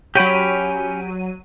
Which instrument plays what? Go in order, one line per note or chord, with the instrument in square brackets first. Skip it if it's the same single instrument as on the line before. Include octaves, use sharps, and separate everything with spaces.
[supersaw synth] F#3 D#7 [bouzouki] C#4 [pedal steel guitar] G4 G5 B5